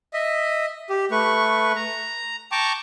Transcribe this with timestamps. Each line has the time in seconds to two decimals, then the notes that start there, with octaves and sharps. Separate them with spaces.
0.13 D#5 E5
0.90 G4
1.11 A3 B4 C#6
1.76 A#5
2.52 G5 A5 A#5 C#6 D6